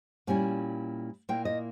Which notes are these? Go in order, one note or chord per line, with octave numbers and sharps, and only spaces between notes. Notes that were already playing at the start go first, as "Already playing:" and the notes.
A#2 G3 C#4 E4 G#5
A#2 A#3 E4 G5
D#5